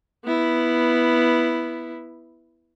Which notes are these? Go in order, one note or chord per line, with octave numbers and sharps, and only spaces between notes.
B3 E4